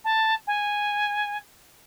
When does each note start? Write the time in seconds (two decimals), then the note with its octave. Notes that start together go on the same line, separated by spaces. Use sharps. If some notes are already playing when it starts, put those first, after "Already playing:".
0.04 A5
0.47 G#5